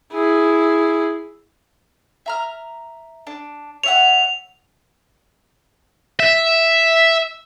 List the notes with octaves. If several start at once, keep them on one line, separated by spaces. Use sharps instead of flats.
E4 G#4
E5 A#5 F6
D4
C#5 E5 F#5 F7
E5